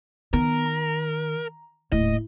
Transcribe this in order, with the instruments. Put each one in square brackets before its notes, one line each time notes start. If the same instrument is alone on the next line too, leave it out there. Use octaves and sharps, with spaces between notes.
[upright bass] D#3 [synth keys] B3 [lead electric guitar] A#4
[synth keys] A#5
[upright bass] D#1 A2 [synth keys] E4 [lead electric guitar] D#5